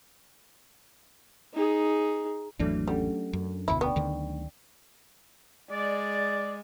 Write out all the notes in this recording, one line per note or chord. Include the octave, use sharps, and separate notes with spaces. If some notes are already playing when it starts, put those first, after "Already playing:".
D#4 G#4
G#1 E2 E3 F#3 A3 D4
G3 C#4 A4 F#5
F#2
F1 D2 B2 E4
B3 D5 G5 C#6
D2 D3 D#3
G#3 D5